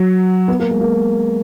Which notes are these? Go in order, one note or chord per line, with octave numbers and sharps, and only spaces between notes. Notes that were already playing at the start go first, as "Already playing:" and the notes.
Already playing: F#3
B3
A#3
G#3
A#3